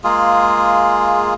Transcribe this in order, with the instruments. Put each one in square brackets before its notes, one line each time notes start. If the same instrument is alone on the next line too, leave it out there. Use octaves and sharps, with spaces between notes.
[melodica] G#3 A#3 F4 G#4